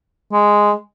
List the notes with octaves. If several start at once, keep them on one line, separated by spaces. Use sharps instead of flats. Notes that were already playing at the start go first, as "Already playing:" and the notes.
G#3